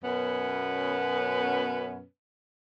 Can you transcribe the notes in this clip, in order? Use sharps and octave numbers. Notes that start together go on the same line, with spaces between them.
F#2 B2 B3 C#4 B4